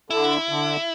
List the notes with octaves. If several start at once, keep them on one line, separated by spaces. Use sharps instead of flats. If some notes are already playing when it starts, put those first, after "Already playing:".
D3 E4
D3